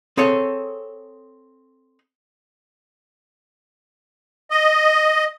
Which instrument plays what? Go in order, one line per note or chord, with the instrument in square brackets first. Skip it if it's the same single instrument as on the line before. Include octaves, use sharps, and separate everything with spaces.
[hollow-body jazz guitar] C4 G#4 A4 C#5
[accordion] D#5